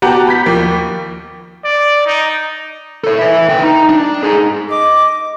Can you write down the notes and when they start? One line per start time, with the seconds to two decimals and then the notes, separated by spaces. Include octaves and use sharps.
0.02 B3 F#4 G4 A5 A#5
0.27 B5 G6 B6
0.46 D#2 F3 A#3
1.64 D5
2.06 D#4
3.04 A4 C#5
3.19 B4 E5
3.49 D3 G5
3.62 D#4
3.89 D4
4.23 D#4 G#4
4.71 D#5 D6